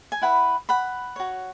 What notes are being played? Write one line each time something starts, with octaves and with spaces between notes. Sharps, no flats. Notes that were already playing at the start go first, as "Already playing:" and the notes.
G#5
E4 B4 F#5 B5
F#5 B5
F#4 C#5